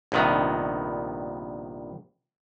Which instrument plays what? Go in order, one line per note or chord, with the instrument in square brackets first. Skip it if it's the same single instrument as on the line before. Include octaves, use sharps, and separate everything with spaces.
[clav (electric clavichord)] A#1 G2 C3 D#3 B3